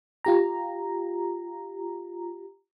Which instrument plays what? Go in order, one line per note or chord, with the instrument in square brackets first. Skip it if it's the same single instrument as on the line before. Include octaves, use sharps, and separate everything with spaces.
[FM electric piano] F4 G4 A#5